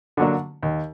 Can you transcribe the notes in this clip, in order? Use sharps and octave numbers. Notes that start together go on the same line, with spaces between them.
D3 F#3 A#3 D4
D#2